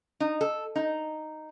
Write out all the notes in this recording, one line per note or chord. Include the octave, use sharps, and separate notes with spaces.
D#4
A4
D#4